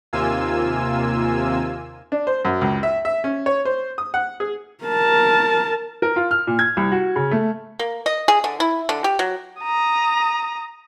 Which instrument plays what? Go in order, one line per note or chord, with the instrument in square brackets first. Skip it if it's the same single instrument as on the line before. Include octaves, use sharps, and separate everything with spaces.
[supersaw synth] D#2 C3 A#3 F4 G#5 E6
[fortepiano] D4
C5
F#2
C#2
E5
E5
C#4
C#5
C5
D#6
F#5
G#4
[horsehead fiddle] A#4 A5
[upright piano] A#4
F4
F6
A#2
G#6
C2
F#4
C#3
A3
[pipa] A#3
D#5
G#4
D3
E4
D3
G4
F#3
[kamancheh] A#5 D#6